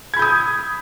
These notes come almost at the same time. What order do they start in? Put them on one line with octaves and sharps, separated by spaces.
G#6 B5 G6 D#6